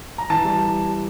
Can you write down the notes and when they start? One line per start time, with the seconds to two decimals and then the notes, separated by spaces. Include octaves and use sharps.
0.18 A#5
0.30 E3 A5
0.45 G3